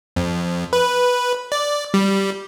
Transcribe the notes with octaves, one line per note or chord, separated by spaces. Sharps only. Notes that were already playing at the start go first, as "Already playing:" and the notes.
F2
B4
D5
G3